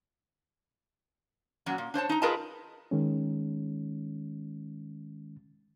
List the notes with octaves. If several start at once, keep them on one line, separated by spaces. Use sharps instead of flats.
A#2 F#3 C#4 F#4
A#2
D4 C5 C#5 A5
D#4 A#5
F4 G#4 A#4 B4 D#5 A5
D#3 G#3 C#4